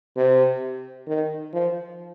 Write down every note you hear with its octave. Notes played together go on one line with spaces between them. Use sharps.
C3
D#3
F3